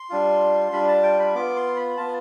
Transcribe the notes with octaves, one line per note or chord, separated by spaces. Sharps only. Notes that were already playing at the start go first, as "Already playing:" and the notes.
Already playing: C6
G3 D4 F4
G3 D4 F4 B5
A5
G5
B5
B3 F4 D6
C6
B5
B3 F4 A5